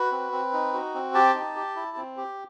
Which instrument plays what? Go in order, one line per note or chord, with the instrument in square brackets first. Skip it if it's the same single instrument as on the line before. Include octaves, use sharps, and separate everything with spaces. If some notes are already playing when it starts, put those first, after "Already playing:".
Already playing: [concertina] F#4 B4
C4
C4
D#4
F#4
C4
G4 A5
D#4
G4
E4
C4
G4